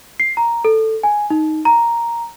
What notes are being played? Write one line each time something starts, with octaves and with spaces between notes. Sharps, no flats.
C7
A#5
A4
G#5
D#4
A#5